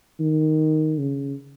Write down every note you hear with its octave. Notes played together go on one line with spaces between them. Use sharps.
D#3
C#3